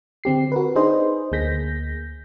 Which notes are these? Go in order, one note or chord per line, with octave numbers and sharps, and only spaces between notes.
D3 C4 G4 C7
F#4 A#4 B4
D4 D#4 G#4 B4 C5 D#5
D2 A#3 G#4 G6 A#6 B6